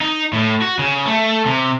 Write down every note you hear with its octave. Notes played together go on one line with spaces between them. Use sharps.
D#4
A2
F#4
C#3
A3
C3